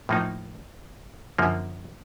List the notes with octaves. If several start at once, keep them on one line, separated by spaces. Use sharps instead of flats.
A2 F3 A#3 D#4
F#2 D3 F3 A#3